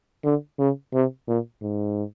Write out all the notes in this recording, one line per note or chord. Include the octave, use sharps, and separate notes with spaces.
D3
C#3
C3
A#2
G#2